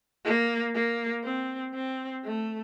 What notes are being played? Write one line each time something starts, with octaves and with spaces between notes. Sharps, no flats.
A#3
A#3
C4
C4
A3